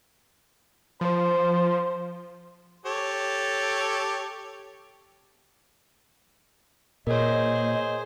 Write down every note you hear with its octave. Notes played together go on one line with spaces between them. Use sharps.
F3 C5
G4 A4 C#5
A#2 G#4 A#4 C5 C#5 D#5